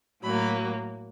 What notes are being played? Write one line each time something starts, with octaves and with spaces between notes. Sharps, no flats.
A2 F#3 A#3 B5